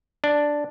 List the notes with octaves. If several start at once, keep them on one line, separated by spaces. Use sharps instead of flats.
D4